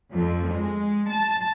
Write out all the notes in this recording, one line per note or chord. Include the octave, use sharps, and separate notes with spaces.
F2
G#3
A5